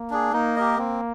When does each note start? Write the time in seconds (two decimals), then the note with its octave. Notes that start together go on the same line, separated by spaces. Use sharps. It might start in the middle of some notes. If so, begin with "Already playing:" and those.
Already playing: A#3
0.10 D4 G#4
0.33 A#3 D#4
0.56 G4 A#4 D#5
0.78 A#3 C4